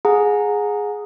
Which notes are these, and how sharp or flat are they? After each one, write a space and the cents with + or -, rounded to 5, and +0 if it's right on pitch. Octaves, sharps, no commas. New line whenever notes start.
G#4 +0 F#5 -35 A#5 -10